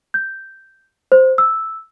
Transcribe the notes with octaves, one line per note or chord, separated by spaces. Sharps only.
G6
C5
E6